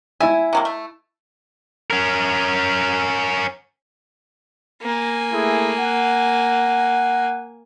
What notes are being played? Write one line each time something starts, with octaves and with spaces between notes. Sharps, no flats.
E4 E5 G#5
C3 F#3 A#3
A3
C#4 A#4
A#3 G#5
A3 E4 G#4
F#5